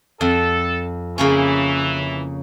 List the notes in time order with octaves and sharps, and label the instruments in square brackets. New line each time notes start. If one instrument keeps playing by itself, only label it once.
[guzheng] F2 [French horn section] A4
[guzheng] C#3 A#3 C#4 [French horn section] E3